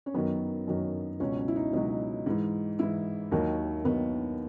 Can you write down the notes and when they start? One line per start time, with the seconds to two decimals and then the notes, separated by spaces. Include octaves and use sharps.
0.06 C#4
0.14 F#2 D#3 F#3 B3
0.68 F#2 D#3 F#3
1.20 C#2 B2 F#3 C#4
1.38 C#4
1.48 E4
1.56 D#4
1.73 C#2 B2 F#3 D#4
2.26 G#2 E3
2.79 G#2 E3 E4
3.32 D#2 D#3 F#3
3.84 D#2 D#3 F#3 B3